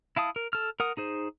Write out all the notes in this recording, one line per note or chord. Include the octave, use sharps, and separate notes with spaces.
E4 F5 A5 D#6
A#4
A4 F6
A#4 F#5 D#6
D#4 G#4 C5